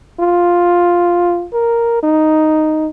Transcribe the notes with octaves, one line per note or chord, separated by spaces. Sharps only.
F4
A#4
D#4